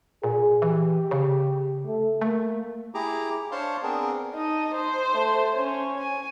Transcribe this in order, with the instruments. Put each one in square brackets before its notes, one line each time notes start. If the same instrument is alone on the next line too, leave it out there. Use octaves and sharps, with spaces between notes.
[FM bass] A#2 [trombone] G#4
[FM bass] E3 [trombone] G4
[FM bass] C#3
[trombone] A3
[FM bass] A3 [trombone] A#3
[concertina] E4 G4 G#4 A#5 D6
D4 C5 C#5 F5 A5 C6
B3 C4 D4 G#4 A#4
[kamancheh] D#4 A5 [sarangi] D#5
[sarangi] C5
[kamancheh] A3
C#4 C#5
[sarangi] G#5